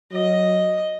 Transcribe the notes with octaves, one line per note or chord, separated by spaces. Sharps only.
F#3 D#5